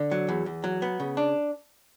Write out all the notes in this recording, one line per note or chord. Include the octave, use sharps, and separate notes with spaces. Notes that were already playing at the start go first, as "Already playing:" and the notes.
Already playing: D3
F#3
E2
E2
F#3
B3
C#3
D4